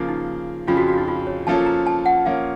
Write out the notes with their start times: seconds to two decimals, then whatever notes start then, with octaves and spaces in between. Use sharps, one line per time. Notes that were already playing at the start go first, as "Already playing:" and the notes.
Already playing: C#3 F3 A#3
0.09 D#4
0.67 F2 C#3 F3 F4
0.77 F#4
0.88 F#4
0.93 F4
0.98 D#4
1.08 F4
1.27 C#5
1.47 F3 A#3 C#4 F4 A4 A5
1.66 A#5
1.86 A5
2.06 F#5
2.26 F3 A#3 C#4 F5